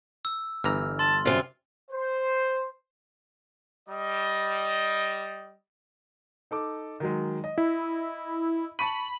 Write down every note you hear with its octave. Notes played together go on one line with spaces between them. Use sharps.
E6
G1 E3 A#5 F6
A5 C6
F#2 C3 F4
C5
G3 D#5
D#4 A4 D6
D#3 F#3 G#3
D#5
E4
A5 B5 C#6 D#7